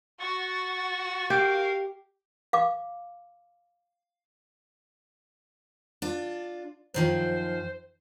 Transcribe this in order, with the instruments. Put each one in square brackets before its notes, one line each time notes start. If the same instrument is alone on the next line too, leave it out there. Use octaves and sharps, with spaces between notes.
[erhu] F#4 [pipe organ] F#5 C#6 A6
[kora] G4 [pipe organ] A#4 F5
[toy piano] F5 D6
[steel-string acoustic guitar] D4 F4
[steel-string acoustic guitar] F#2 D#3 F3 [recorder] C5